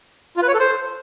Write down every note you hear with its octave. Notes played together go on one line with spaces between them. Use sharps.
F4
B4
C#5
A4
C5